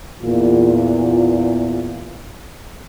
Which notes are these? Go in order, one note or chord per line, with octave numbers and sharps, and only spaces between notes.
E2 A#2 F4